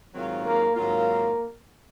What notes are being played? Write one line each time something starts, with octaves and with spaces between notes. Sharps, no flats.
G#2 D#3 F#3 C4 F4
A#3
G#2 D#3 F#3 A#3 C4 F4